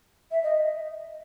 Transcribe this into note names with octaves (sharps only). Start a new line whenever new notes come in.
E5
D#5